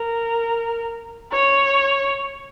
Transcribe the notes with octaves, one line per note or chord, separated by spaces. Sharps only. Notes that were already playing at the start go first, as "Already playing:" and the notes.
Already playing: A#4
C#5